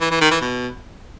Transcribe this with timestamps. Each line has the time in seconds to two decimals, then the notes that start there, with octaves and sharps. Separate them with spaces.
0.01 E3
0.11 E3
0.21 D#3
0.31 E3
0.41 B2